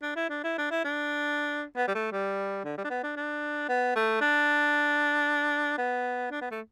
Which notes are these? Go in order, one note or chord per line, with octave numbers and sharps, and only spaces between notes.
D4
E4
D4
E4
D4
E4
D4
B3
G3
A3
G3
D3
G3
D4
B3
D4
D4
B3
A3
D4
B3
D4
B3
A3